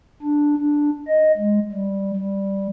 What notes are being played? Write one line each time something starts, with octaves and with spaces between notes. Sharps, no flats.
D4
D4
D#5
G#3
G3
G3